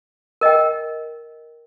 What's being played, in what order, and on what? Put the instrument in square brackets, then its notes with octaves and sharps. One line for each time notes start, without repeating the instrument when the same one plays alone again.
[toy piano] A#4 D#5 G5